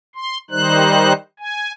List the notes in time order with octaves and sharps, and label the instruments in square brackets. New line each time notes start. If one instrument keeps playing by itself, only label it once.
[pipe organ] C6
D#3 G3 D#4 C5 F#6
G#5